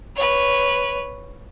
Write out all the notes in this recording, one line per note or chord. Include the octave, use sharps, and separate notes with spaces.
B4 C#5